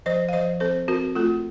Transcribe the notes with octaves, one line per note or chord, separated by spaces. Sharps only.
F3 C5 D#5
F5
F3 C5 D#5
C4 A4 C5
C4 F#4 A#4
A3 F4 A4